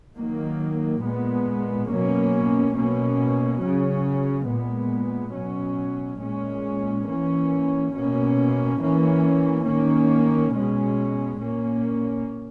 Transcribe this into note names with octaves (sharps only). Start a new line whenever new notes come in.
D#3 F#3 A#3
A#2 G#3 B3
B2 F#3 A#3 C#4
B2 A#3 C#4
C#3 F#3 C#4
A#2 G#3 B3
B2 F#3 C#4
A#2 G#3 C#4
E3 A#3 C#4
B2 A#3 C#4
E3 A#3 C#4
D#3 A#3 C#4
B2 G#3 C#4
A#2 A#3 C#4